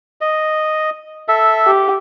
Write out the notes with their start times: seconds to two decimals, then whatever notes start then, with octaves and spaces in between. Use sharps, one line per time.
0.21 D#5
1.28 A4 E5
1.67 G4